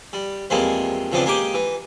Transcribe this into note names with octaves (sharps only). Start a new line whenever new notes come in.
G3
E2 F3 G3 G#3 A#3 C4
C#3 E3 F3 B3 C4 D4
G#3 A#3 D#4 G4 G5 D6
E3